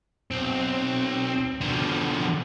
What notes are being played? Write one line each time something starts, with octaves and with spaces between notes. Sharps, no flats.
B1 C4
B2 D3 F3 G3